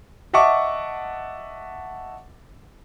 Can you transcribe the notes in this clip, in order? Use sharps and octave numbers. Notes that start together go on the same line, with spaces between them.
D#5 E5 F#5 A5 C#6 D6